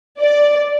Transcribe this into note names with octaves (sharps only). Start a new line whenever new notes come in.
D5